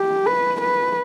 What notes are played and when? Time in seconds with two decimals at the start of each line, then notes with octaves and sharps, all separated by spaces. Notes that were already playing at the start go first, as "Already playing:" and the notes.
Already playing: G4
0.27 B4
0.61 B4